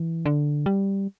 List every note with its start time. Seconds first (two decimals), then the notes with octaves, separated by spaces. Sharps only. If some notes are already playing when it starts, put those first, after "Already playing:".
Already playing: E3
0.26 D3
0.66 G3